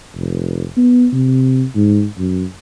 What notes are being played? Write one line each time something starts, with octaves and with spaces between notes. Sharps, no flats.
F1
B3
C3
G#2
F#2